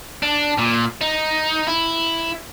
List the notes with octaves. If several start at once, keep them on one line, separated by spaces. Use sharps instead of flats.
D4
A#2
D#4
E4